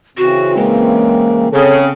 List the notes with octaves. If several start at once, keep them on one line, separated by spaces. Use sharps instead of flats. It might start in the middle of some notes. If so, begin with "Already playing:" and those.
C#3 E3 C4 F#4
G#3 A#3
C#3 C4 A4